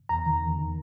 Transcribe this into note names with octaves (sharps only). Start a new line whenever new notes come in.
E2 A#5
D#3
E2
D#3